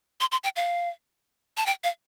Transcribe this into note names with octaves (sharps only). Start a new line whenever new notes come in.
C6
C6
G5
F5
A5
G5
F5